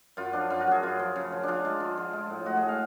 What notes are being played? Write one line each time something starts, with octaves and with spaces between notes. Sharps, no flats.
F#2 F4
F3 D4
F#2 F4
F#4
F#2 G#4
F#2 F4
F3
C#3
F3
F3 D4 F4
G#3
F3
F3
G#3
A2
G#3 F#4
G#4
A2
F5